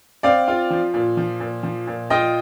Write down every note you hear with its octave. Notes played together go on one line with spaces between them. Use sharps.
C4 D5 F5
F4
F3
A#2
F3
A#2
F3
A#2
F4 D#5 G5